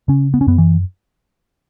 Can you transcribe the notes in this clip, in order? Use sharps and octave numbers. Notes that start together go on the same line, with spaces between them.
C#3 C#4
B3
C#4
F#2 B3
E3